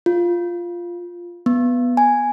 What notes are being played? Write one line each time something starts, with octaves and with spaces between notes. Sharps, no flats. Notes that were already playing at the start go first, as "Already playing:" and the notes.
F4
B3
G#5